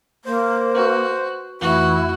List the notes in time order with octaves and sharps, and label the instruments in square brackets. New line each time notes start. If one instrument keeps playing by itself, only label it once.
[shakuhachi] A#3 [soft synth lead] C5
[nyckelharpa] F#4 [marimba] B4
[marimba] F2 A3 C#6 [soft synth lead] E3 [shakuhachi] E4 [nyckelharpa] F#4